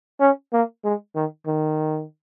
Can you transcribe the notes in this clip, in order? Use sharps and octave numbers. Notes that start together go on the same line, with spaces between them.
C#4
A#3
G#3
D#3
D#3